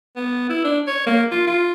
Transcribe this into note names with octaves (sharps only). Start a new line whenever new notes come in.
B3
E4
D4
C#5
A#3
F4
F4